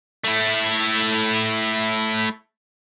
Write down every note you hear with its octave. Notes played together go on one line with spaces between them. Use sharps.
A3 E4